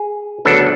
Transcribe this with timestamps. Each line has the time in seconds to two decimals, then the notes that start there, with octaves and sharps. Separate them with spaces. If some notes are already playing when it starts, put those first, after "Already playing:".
Already playing: G#4
0.45 D2 C#3 F#3 B3 D4 A4